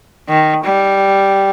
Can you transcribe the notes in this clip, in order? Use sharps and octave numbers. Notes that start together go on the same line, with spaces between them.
D#3
G3